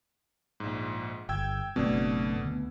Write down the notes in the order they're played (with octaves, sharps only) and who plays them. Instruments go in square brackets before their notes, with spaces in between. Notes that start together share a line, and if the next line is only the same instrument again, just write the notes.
[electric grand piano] A#1 G#2
[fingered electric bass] G1 [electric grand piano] G5 E6 G#6
[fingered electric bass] F#1 A3 C4 [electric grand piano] B2 D4
[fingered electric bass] D2 B3